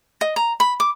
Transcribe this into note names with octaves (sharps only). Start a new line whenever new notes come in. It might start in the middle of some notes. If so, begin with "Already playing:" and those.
D#5
A#5
B5
D6